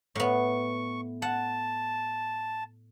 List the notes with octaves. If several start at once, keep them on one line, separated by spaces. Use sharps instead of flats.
A2 B3 C#6
F#5 A5